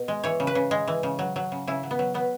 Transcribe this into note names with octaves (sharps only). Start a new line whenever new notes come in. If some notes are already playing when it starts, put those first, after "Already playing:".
Already playing: B2
G#3
E3 C#5
C#3
B4
C#3
G#3
E3
C#3
F#3
F#3
C#3
C#3 E4
F#3
B3
F#3
F#3 B3